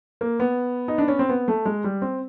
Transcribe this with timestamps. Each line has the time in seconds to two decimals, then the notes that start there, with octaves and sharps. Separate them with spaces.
0.21 A#3
0.40 B3
0.88 D#4
0.98 D4
1.08 C#4
1.19 C4
1.29 B3
1.48 A3
1.65 G#3
1.84 G3
2.02 C4